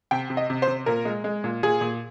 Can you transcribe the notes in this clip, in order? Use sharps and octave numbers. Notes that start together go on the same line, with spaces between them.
C3 G5
C3
D#5
C3
C5
C3
A#2 A#4
G#3
G#3
A#2
A#2 G#4
A#2